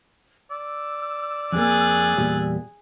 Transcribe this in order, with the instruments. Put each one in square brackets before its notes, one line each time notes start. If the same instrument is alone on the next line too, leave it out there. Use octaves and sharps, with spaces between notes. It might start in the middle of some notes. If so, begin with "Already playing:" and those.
[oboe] D5 [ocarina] E6
[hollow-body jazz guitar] F2 A#3 [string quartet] G#4 F#6 A6
[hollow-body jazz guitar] E2 A#2 G3